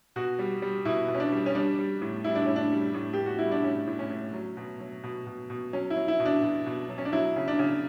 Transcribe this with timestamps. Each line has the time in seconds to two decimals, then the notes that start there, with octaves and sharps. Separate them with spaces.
0.16 B2 F#4
0.39 G3
0.62 G3
0.85 B2 E4
1.08 B2
1.14 C#4
1.20 D4
1.32 G3
1.46 C#4
1.55 G3 D4
1.78 G3
2.02 A2
2.24 G3 E4
2.35 D4
2.46 A2 C#4
2.56 D4
2.72 G3
2.94 A2
3.13 A2 G4
3.26 F#4
3.38 G3 E4
3.51 D4
3.64 A2 C#4
3.87 A2
3.99 C#4
4.11 A2
4.33 F#3
4.57 B2
4.80 F#3
5.03 B2
5.27 B2
5.50 B2
5.73 F#3 C#4
5.90 E4
5.96 F#3
6.08 E4
6.20 B2
6.25 D4
6.43 B2
6.66 B2
6.89 F#3
6.98 C#4
7.05 D4
7.13 F#3 E4
7.36 C#3
7.48 D4
7.59 C#3